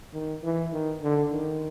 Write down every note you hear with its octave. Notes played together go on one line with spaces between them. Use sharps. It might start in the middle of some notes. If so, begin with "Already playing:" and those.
D#3
E3
D#3
D3
D#3